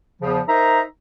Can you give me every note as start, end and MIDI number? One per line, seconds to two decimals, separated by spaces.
0.22 0.41 40
0.22 0.41 49
0.22 0.41 53
0.48 0.80 63
0.48 0.80 70
0.48 0.80 72
0.48 0.80 76
0.48 0.80 82